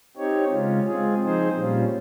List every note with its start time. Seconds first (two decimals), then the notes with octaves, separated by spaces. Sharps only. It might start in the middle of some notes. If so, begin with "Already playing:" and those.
0.17 C4 D#4 G4 C#5
0.52 C#3 G#3 C#4 F4
0.86 G#3 C4 F4 G#4
1.22 F3 C4 D#4 G#4 C5
1.56 A#2 G3 C#4 F4